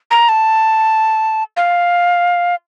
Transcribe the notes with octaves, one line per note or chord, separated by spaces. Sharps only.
A#5
A5
F5